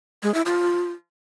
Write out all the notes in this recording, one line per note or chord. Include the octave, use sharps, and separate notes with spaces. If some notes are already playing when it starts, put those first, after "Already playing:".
G#3
E4
F4